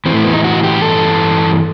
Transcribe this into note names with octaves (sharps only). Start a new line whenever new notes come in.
A2 E3 A3 C4
B3
D#4
F#4
G4
G2 E3 A4